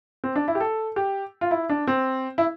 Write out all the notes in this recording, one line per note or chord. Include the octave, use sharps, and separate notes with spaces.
C4
D4
E4
G4
A4
G4
F4
E4
D4
C4
E4